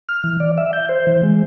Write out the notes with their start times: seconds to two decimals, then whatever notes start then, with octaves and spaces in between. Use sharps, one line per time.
0.09 F6
0.24 E3
0.40 D5
0.58 E5
0.73 G6
0.89 C5
1.07 E3
1.23 G#3